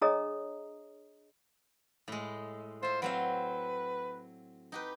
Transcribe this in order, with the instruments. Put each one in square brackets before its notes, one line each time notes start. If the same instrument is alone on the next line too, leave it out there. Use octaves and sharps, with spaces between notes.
[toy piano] D4 G#4 C#5 D#5 A#5 D#6
[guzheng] A2 G#3
[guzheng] F4 E5 [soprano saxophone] C5
[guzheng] F#3 C4 F5 [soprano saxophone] B4
[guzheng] D#4 G4 B4